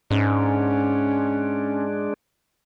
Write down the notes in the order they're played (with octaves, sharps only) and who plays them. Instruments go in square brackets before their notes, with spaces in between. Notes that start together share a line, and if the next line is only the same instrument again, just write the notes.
[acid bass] G#2 [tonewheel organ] G#3 D4 [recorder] C#4